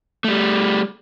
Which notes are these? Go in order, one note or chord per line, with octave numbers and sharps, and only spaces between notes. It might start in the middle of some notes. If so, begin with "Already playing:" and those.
G3 A3